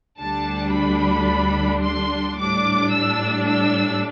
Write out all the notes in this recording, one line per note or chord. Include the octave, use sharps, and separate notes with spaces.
D2 D3 G3 D4 A5
B5
C6
A2 G3 D4 D6
E6
E6